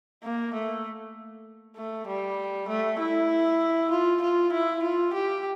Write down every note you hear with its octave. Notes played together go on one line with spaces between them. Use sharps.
A#3
A3
A3
G3
A3
E4
F4
F4
E4
F4
G4